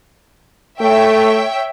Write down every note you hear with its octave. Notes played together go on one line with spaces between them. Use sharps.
A3 C#5 E5 G5